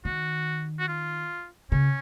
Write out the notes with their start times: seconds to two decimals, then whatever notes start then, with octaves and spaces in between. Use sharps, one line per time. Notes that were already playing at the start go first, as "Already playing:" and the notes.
0.05 D#3 F#4
0.79 F#4
0.88 F4
1.72 C#3 C#4